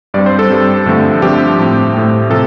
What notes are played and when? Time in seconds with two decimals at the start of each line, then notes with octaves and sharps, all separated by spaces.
0.14 G2 G3 C4 D5
0.26 C5
0.39 A4
0.50 G2 G3 C4
0.86 G2 D3 F3 A3 C4
1.22 G2 D3 F3 A3 C4 G4
1.58 A2 A3 C4
1.94 A2 A3 C4
2.30 C3 F3 A4